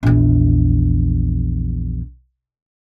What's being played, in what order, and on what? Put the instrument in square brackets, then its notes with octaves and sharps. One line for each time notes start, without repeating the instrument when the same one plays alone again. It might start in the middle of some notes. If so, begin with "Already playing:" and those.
[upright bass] A#1 E2